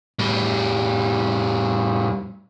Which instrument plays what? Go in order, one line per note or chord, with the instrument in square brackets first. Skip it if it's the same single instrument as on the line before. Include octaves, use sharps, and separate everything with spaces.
[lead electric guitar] A2 G3